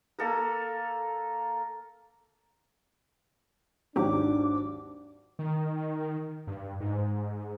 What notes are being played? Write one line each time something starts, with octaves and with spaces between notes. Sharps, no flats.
A#3 A4 A#4
G#1 D#2 G#2 F#3 D4 G4 D6
D#3
G2
G#2